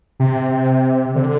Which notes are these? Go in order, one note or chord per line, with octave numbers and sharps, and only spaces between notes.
C3
D3